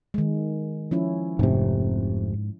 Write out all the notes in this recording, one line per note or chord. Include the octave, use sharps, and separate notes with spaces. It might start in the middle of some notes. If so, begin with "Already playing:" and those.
D#3 G#3
F3 C#4 E4
F1 G#2 C3